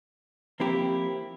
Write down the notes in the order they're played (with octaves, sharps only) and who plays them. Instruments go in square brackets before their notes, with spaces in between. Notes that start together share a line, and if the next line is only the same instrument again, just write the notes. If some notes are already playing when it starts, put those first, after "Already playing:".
[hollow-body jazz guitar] F3 A#3 C4 E4 G4